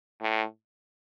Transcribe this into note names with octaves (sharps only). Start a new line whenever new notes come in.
A2